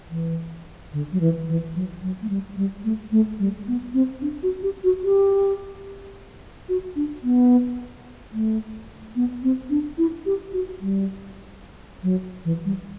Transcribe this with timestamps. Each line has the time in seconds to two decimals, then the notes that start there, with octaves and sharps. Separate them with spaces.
0.10 E3
0.93 D3
1.12 F#3
1.20 E3
1.48 E3
1.75 F#3
2.02 F#3
2.22 A3
2.30 G3
2.57 G3
2.84 A3
3.12 A3
3.39 G3
3.67 B3
3.94 C4
4.22 D4
4.43 F#4
4.63 G4
4.84 F#4
5.03 G4
6.69 F#4
6.96 D4
7.23 B3
8.33 A3
9.16 B3
9.43 C4
9.70 D4
9.98 E4
10.26 G4
10.53 F#4
10.81 G3
12.03 F#3
12.45 E3
12.65 G3